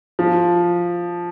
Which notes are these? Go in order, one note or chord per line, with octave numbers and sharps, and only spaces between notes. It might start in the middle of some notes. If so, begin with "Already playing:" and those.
F3